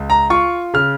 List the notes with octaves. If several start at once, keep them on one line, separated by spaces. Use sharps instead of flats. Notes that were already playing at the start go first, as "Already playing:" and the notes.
Already playing: C#2
A#5
F4 C#6
C#3 F6